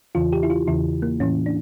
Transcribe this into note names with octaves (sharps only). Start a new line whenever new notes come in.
E2 C#3 E3 F4
G4
E4
F4
E2 C#3 E3 E4
A#3
A2 E3 C#4
D4